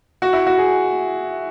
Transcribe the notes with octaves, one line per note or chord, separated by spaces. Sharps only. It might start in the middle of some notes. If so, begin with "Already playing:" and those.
F#4
E4
F#4
G#4